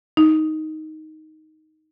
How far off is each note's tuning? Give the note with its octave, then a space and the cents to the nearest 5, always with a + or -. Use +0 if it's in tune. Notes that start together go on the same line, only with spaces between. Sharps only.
D#4 +5